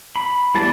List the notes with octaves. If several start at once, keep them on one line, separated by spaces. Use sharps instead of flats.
B5
E3 G3 B3 D4 A5